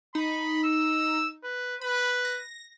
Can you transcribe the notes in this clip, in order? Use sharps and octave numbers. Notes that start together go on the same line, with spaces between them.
D#4 B5
E6
B4
B4 B5
A#6